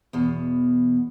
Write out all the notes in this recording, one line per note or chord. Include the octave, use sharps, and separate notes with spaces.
E2 B2